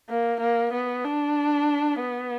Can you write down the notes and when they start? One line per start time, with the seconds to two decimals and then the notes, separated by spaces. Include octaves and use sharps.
0.09 A#3
0.41 A#3
0.73 B3
1.05 D4
2.02 B3